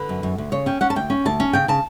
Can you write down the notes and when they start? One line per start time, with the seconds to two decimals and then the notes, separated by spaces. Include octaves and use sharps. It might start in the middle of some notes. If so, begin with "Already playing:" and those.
Already playing: D3 B4
0.09 F#2
0.23 F#2
0.38 D2
0.52 C#3 C#5
0.66 C#4 G5
0.81 C#4 F#5
0.90 A5
0.96 D2 G5
1.10 C#4
1.25 D2 A5
1.40 C#4
1.53 C#3 G5
1.68 C#3 A5